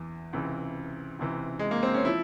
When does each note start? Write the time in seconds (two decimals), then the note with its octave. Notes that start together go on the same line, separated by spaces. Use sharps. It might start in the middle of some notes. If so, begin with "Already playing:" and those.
Already playing: E2 E3
0.33 C#2 C3 E3
1.19 C#2 C3 E3
1.59 G#3
1.71 A#3
1.83 C4
1.94 C#4
2.05 F3 E4